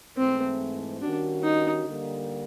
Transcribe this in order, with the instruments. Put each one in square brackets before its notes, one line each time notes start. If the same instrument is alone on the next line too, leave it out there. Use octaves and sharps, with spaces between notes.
[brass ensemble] G#2 E3 A3 [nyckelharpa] C4
[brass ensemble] D#3 G3 A#3 C#4 F#4 [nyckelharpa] D4
[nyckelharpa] D#4
[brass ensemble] D3 G3 A#3